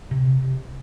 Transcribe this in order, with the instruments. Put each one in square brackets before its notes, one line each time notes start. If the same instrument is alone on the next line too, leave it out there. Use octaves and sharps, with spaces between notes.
[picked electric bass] C3